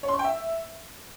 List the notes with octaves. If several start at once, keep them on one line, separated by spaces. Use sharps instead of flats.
C#5
C6
C#6
G5
E5